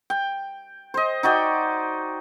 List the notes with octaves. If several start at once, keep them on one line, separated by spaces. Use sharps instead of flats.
G5
C5 D#5
D#4 F#4 D5 G5